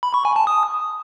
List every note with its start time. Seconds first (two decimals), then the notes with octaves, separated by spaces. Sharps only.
0.03 B5
0.14 C#6
0.25 G#5
0.36 A5
0.47 D#6